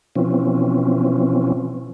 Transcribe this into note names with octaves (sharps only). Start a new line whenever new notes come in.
B2 E3 F3 C4 C#4